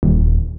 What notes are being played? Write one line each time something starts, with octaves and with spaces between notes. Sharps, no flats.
D#1